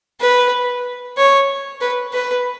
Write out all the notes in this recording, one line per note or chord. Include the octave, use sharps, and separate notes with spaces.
B4
C#5
B4
B4